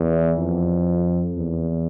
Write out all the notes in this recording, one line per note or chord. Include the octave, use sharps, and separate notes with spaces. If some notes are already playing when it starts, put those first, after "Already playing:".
Already playing: E2
F2
E2